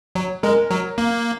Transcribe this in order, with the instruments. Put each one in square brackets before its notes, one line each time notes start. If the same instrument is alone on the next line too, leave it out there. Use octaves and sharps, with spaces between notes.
[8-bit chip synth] F#3
[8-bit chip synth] G#3 [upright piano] A#4
[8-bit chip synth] F#3
A#3